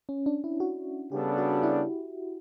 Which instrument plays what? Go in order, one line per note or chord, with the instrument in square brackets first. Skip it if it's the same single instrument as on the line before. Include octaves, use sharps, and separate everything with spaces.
[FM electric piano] C#4
D4
E4
F#4
[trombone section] C#3 G3 B3 D4 A4 [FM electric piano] G4
[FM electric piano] F#4
E4